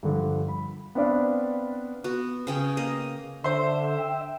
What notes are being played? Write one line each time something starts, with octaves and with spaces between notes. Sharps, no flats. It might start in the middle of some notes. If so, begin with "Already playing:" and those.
G2 D3 F3
B5
B3 C4 D4 B4 D5 F5
B3 F#4
C#3 C#4 G5
A#3 D#5
D3 C5 E5 C6
G5